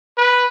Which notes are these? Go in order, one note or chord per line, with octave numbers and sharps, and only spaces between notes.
B4